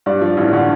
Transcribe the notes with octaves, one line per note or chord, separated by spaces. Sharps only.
G2 D5
F3
A1
D3